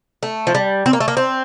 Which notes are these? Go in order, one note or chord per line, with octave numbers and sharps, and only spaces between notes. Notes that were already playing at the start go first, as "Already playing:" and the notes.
A3
F3
G3
C4
A#3
A3
A#3
C4